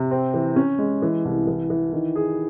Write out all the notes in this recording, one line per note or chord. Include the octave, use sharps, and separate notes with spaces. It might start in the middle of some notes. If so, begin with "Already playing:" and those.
Already playing: C3
C4
E3
C#4
G#3
E3
C2
E3
E3
D#3
G#4